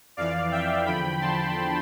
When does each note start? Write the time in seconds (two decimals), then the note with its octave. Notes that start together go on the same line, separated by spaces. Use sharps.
0.17 F2 E3 D5 F5
0.51 E5 G5
0.86 E2 D3 F3 G5 B5
1.21 A5 C6